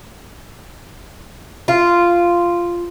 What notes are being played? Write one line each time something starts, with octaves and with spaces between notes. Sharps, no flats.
F4